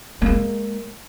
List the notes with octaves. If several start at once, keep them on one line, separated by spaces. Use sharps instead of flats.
G#3 A#3